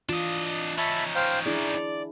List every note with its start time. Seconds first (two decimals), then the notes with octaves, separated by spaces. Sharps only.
0.09 E3 D4 F4 D#5
0.78 C#4 D#4 E5 A5 B5
1.15 C5 F5 G5
1.46 D4 E4 G#4 D5